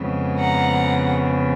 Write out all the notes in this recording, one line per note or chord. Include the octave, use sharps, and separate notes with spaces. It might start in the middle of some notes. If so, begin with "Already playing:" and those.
Already playing: F2 C#3 G#3 B3
F#5 A#5